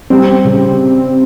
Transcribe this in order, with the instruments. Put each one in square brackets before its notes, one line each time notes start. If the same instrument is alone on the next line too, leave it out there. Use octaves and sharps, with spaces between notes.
[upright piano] G3 [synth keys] C4
[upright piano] C#3